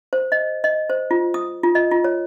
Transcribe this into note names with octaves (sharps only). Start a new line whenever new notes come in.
C5
D#5
D#5
C5
F4
D#6
F4
D#5
F4
C#5